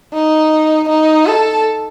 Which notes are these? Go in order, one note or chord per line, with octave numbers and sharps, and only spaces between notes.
D#4
D#4
A4